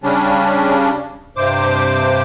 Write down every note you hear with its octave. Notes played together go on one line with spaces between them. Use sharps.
C#3 G3 C#4 D4
G2 C3 C5 D6